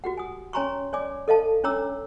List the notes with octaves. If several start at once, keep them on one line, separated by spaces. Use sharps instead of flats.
F#4 G4 F#5
G#5 D#6
C#4 C#5 G#5 A#5 C6 C#6
C#5 D5 G#5 D6
A4 D#5 F5 A5
C#4 D4 C#5 A#5 D6 E6